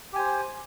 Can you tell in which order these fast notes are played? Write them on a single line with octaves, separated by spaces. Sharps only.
G4 G#5 C5